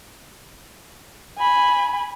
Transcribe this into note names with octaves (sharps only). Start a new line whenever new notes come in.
G#5 B5